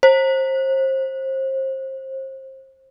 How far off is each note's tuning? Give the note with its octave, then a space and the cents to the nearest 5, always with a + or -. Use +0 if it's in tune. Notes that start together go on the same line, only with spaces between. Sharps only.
C5 +30